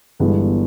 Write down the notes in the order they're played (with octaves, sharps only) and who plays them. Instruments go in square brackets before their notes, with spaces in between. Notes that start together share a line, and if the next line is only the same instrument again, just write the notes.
[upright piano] G1 G2 E3 G#3 B3